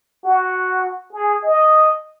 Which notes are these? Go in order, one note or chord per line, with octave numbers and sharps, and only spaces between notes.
F#4
G#4
D#5